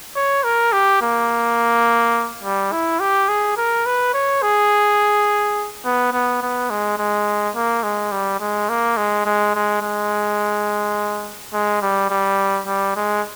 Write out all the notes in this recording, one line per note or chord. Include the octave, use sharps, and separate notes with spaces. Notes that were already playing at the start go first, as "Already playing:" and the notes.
C#5
A#4
G4
A#3
G3
E4
G4
G#4
A#4
B4
C#5
G#4
B3
B3
B3
G#3
G#3
A#3
G#3
G3
G#3
A#3
G#3
G#3
G#3
G#3
G#3
G3
G3
G3
G#3